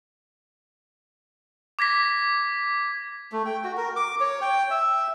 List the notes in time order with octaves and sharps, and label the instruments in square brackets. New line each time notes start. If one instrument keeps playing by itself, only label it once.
[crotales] D6 G#6 A#6 B6
[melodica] A3
G5
F#4
A#4
D6
C#5
G5
E5